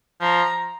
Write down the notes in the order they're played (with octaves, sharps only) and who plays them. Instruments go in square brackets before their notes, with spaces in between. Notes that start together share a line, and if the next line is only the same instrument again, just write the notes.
[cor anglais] F3 [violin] A#5